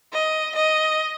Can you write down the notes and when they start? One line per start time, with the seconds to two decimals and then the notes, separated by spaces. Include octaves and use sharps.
0.13 D#5
0.55 D#5